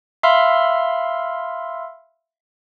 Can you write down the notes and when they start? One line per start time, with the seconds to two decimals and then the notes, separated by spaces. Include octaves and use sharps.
0.23 E5 F5 B5 C6 E6 F6